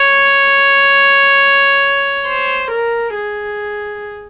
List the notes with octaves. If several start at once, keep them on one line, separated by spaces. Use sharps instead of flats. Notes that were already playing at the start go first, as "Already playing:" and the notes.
Already playing: C#5
C5
A#4
G#4